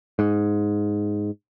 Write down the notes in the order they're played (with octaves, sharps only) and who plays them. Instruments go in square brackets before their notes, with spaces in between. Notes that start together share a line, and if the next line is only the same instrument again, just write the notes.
[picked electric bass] G#2